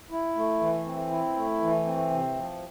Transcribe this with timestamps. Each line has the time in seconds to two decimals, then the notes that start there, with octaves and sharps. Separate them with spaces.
0.11 E4
0.36 A3
0.60 E3
0.86 C4
1.11 E4
1.36 A3
1.60 E3
1.86 C4
2.11 C3
2.36 F3